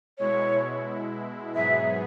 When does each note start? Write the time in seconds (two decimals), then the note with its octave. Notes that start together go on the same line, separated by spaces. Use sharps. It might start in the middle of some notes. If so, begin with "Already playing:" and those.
0.18 B2 G#3 E4 C#5
1.55 G#2 F#3 B3 G#4 E5